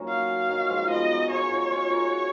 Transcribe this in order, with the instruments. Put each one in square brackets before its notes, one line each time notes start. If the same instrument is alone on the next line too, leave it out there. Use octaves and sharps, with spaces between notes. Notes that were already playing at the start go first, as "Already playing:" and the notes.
Already playing: [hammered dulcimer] F#3 A#3 C#4 D#4
[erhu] F5
[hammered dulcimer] D#3 F#3
F3 G#3
[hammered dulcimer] G#3 B3 [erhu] D#5
[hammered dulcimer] F#4 A#4
[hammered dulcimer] F4 G#4 [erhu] C#5
[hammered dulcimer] G#4
D#4 F#4
F4 G#4
F#4 A#4